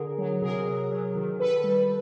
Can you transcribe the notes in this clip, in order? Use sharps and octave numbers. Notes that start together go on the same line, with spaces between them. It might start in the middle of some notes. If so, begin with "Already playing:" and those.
Already playing: D3 G#4 A#4
F#3
C3 G#4 A#4
F#3
F#3
D#3
D#3 A4 B4
G3